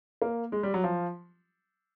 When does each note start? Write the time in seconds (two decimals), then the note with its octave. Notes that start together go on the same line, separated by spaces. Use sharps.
0.22 A#3
0.52 G#3
0.63 G3
0.74 F#3
0.84 F3